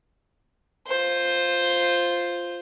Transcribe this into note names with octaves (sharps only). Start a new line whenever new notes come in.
F4 C5